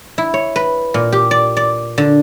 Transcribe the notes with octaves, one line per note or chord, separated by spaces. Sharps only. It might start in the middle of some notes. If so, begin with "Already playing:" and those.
E4
C#5
B4
A#2
G4
D5
D5
D3